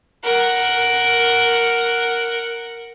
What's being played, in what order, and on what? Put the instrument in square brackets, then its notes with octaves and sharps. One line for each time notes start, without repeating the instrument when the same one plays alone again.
[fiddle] A#4 F#5